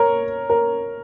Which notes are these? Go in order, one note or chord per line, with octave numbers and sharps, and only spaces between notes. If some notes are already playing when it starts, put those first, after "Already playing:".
Already playing: A#4 C#5
A#4